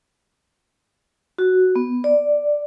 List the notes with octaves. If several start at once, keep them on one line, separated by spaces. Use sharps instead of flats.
F#4
B3
D5